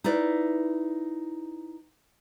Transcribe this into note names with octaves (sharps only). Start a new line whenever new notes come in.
D#4 E4 B4 D5